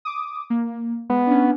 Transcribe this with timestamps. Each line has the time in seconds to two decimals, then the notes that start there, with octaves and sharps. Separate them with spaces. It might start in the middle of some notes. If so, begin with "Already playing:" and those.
0.05 D6 D#6
0.50 A#3
1.10 G#3 B3
1.27 C#4 D4